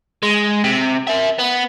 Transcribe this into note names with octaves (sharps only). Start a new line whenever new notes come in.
G#3
C3
A#4 E5
B3